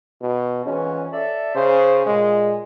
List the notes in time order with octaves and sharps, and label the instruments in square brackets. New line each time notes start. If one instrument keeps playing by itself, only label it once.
[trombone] B2
[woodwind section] F2 G#2 E3 [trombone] C#4
[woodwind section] A4 D5 E5
[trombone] C#3 [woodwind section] C5
[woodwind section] A#2 [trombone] G#3